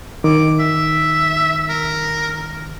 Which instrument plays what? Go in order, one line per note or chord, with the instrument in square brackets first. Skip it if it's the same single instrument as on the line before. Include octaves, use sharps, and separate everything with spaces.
[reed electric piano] D#3 [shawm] D6
[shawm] E5
A#4